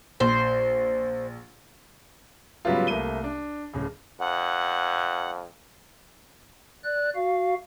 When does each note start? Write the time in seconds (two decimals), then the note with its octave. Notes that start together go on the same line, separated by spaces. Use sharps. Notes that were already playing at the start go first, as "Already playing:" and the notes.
0.20 A#1 C5
2.65 G#2 C#3 F#3 G3 B3 F4
2.87 C2 A3 A#3 D#7 G7
3.24 D4
3.73 D1 C#3
4.21 F2 F#5
6.84 D5 F#6
7.15 F#4 F5